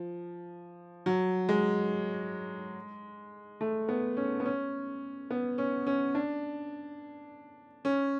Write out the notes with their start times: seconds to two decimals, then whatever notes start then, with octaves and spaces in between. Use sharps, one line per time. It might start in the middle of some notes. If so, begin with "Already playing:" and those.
Already playing: F3
1.06 F#3
1.49 G#3
3.61 A3
3.89 B3
4.17 C#4
4.40 B3
4.45 C#4
5.31 B3
5.58 C#4
5.87 C#4
6.15 D4
7.85 C#4